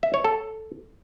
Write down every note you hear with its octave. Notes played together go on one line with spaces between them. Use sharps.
E5
C#5
A4